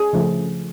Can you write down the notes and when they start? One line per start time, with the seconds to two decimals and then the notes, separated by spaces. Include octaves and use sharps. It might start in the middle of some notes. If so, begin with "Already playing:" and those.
Already playing: G#4
0.13 C#3 F3 A3